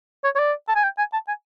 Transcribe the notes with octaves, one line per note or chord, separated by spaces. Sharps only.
C#5
C#5
D5
A5
G#5
G5
G#5
A5
G#5